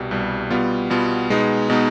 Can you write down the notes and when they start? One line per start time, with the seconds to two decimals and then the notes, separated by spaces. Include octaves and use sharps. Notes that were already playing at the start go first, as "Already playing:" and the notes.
Already playing: C2 B2 G3
0.11 C2 B2 G3
0.50 B2 G3 B3 F4
0.90 B2 G3 B3 F4
1.30 B2 G#3 B3 D#4
1.69 B2 G#3 B3 D#4